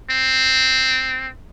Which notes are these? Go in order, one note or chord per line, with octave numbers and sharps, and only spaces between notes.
C4